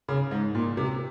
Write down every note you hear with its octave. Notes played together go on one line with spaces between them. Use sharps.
C#3
G#2
A#2
C3